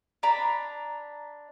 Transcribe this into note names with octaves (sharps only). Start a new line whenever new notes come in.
D4 A#5 B5